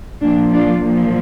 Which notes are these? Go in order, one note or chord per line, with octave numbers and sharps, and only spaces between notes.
A#2 F3 A#3 D4
D4 F4
A#2 F3